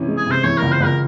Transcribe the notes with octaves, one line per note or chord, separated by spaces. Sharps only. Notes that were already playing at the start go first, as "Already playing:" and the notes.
Already playing: C3 E3 C#4
G#3
G#4
C3 C5
E3 C#5
C#2 A#4
C5
C#2 A#4